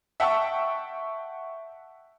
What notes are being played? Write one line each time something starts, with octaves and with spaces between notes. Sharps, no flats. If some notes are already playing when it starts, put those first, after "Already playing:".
E5 F#5 G5 A5 C#6 E6